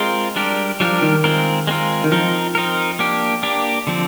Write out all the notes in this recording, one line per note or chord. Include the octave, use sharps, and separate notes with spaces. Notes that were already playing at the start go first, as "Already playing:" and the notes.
Already playing: G#3 C4 F4 A#4
G3 D4 G4 A#4
F3 G3 D4 G4 A#4
D#3
G#3 C4 F4 A#4
G#3 C4 F4 A#4
D#3
F3 C4 D#4 A#4
C4 D#4 A#4
A#3 D4 G4
A#3 D4 G4
D3 F3 C4